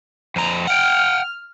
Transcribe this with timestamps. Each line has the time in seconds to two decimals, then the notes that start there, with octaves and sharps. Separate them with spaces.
0.36 F2 A#5
0.67 F#5 G5 F6